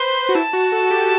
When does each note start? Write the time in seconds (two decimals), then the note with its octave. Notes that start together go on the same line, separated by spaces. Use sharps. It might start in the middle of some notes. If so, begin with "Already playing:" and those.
Already playing: B4 C5 C6
0.29 F#4
0.34 E4 A5
0.53 F#4
0.72 A4
0.90 G4